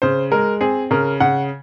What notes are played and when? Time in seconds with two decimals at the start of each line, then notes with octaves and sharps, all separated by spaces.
0.02 C#3 C5
0.32 G#3 A#4
0.61 C4 G#4
0.91 C#3 A#4
1.20 C#3 F#5